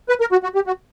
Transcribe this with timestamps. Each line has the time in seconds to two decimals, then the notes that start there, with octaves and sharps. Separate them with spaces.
0.09 B4
0.21 A#4
0.32 F#4
0.43 F#4
0.55 G4
0.67 F#4